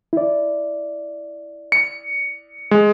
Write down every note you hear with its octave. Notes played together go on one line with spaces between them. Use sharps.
E4 D5
C#7
G#3